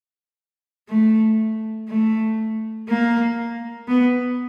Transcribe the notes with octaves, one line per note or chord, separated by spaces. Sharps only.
A3
A3
A#3
B3